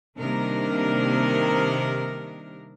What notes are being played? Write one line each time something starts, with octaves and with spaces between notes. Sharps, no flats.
C3 D#3 G3 A#3 D4 A#4